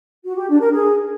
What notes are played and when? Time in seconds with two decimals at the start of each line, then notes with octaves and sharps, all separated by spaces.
0.25 F#4
0.37 G4
0.49 D4
0.60 A#4
0.72 G#4